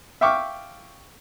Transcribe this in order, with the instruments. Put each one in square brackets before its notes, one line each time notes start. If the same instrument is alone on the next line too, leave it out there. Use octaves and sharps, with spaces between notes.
[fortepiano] E5 F5 G5 C#6 D6 F6